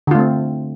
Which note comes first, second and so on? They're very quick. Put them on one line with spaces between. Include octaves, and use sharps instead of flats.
D3 F4 A3 C4